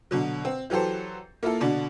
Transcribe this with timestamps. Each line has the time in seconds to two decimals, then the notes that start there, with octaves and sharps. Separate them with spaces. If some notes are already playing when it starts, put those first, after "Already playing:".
0.11 B2 D3 F#3
0.45 C4
0.70 E3 F#3 G4 A4 C5
1.43 A#3 E4 F4 A4
1.60 B2 D3 D4